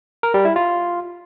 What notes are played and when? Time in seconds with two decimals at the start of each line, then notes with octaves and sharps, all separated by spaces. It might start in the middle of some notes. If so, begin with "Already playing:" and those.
0.23 A#4
0.34 G3
0.45 E4
0.56 F4